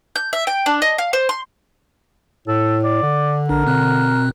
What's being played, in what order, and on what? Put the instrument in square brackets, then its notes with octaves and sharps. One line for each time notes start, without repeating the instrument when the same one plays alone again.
[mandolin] G6
E5
G5
D4
D#5
F5
C5
C6
[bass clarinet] A2 [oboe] A4
[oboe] D5
[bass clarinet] D3
[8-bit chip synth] A#1 D4 [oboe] A#4
[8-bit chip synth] B2 C4 F#6